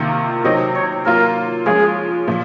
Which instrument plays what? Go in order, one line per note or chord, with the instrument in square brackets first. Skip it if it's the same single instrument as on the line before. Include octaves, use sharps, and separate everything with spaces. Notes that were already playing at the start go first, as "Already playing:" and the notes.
Already playing: [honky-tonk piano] C3 D#3 A#3 F4
[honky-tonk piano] C3 F#3 C4 D#4 [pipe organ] D#5
[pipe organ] C#5
[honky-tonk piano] F#3 A#3 F4 [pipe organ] A#4
[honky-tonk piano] F3 G#3 C#4 F4 [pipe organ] G#4
[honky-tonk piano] A#2 F3